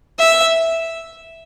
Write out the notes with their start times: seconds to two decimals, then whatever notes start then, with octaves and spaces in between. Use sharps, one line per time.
0.19 E5